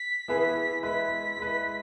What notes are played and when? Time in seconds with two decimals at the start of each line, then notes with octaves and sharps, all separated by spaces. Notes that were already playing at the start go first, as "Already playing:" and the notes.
Already playing: B6
0.28 E3 B3 E4 G#4 B4
0.83 G#3 E4 B4 B6
1.37 G#3 E4 B4